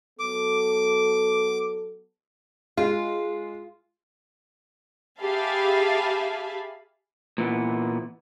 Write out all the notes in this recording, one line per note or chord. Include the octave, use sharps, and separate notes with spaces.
F#3 B3 A4 D6
G#3 F4
G4 G#4 E5 F5 A5 B5
A#2 E3 B3